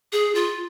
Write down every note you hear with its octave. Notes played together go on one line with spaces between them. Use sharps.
G#4
F4